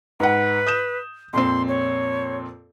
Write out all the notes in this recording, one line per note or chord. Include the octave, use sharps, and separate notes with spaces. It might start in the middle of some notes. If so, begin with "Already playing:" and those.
G#2 B4 F#5
D#6 G6 E7
F2 A#2 C4 C6
C#5